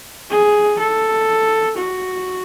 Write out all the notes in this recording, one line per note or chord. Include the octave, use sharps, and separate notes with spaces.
G#4
A4
F#4